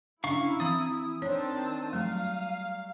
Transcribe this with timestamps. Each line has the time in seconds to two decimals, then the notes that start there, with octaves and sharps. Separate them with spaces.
0.24 C#3 D4 E4 E5 F5 A#5 C#6
0.60 E3 C4 A#5 D#6
1.22 D#3 C4 D4 C#5 A5
1.93 F#3 G3 A3 F5